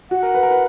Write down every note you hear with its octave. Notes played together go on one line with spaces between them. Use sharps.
F#4 F#5
A#4
B4
A#4
B4